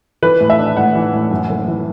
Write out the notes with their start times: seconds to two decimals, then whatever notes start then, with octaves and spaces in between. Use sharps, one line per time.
0.22 E3 B4
0.41 A2
0.50 E5
0.59 D4
0.77 A2 F#5
0.95 E3
1.13 A2
1.31 F#2
1.50 F#1
1.68 E3